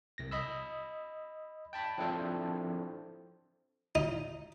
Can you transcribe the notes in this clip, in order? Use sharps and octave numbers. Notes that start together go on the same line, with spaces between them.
C2 A#6
D#5 B5 E6
G5 A5 B5
F3 C4 D4 E4 A4 C5
D#4